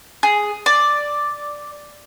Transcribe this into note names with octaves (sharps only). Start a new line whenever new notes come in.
G#4
D5